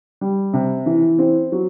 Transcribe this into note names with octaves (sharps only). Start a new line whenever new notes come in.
G3
C3
E3
C4
F#3